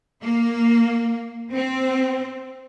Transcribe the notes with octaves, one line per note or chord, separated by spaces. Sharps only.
A#3
C4